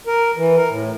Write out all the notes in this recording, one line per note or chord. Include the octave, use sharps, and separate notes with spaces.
A#4
E3
A#4
A2